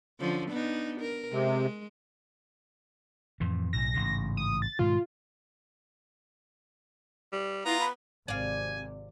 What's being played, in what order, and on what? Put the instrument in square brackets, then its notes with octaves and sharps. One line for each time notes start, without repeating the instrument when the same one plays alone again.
[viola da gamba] D3 F3 C#4
B3 D4 D#4
A#4
[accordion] C3 [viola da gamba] G#3
[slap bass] F2 A2 E3
[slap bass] B1 A2 [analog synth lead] A#6
[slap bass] A1 G#2 C#3
[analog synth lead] D#6
A6
[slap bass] G#2 B2 D#3 [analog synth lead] F4
[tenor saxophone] G3
[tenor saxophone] B3 [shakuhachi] E4 [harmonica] F4 A#5
[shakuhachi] B5
[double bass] G#1 C3 [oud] D5 F5 [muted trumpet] G#5